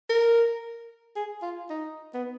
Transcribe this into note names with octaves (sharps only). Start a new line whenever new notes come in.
A#4
G#4
F4
D#4
B3